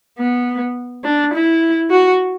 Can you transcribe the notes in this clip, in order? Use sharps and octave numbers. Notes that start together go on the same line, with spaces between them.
B3
D4
E4
F#4